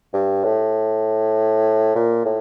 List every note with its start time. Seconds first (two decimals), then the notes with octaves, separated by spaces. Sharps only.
0.14 G2
0.45 A2
1.96 A#2
2.25 A2